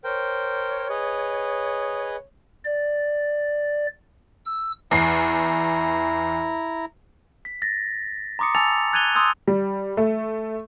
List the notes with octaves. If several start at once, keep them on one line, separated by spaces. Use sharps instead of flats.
A#4 C5 C#5 G5
G#4 B4 D#5
D5
E6
E2 E4 A#5 C7
B6
A6 A#6
A#5 C6 D6 D#6 C#7
G#5 A5 E6 A6 C#7 F7
F#6 G#6 A6 D#7 F7 G7
C6 D#6 E6 G6 G#6
G3
A3